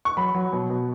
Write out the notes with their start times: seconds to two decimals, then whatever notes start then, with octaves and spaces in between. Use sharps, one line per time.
0.05 C#6
0.17 F#3 B5
0.35 F#3
0.53 B2
0.70 B2